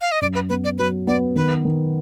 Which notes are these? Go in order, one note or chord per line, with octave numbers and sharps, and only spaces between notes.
F5
D#5
F#2 D5
B4
B3 B4
D5
F#3 B4
B3 D5
D#3 B4
D#3